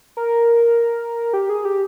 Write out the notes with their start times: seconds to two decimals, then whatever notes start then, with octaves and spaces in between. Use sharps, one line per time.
0.17 A#4
1.33 G4
1.49 G#4
1.65 G4